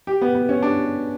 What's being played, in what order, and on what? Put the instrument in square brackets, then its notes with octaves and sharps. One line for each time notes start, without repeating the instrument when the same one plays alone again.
[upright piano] G4
B3
B3
C#4
D4